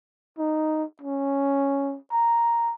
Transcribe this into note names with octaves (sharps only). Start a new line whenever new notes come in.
D#4
C#4
A#5